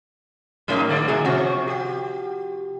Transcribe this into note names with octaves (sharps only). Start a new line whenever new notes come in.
A2 F3 F#3 A#3 C#4 D#4
D3 G#3 D5
A2 F#3 G#4
C3 F3 C4 C#4 F#4
G4